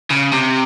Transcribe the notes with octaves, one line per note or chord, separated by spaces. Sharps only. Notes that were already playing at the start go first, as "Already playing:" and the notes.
C#3
C3